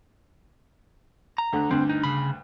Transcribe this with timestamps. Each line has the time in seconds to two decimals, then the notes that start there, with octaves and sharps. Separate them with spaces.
1.38 A#5
1.53 D2 D3
1.71 D2 G2 C4
1.89 D#4
2.03 C#3 B5